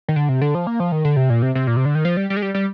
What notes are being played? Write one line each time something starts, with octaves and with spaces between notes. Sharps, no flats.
D#3
D3
C3
D3
F3
A#3
F3
D#3
D3
C3
A#2
C3
C3
A#2
C3
D3
D#3
F3
G3
G3
G#3
G3
G3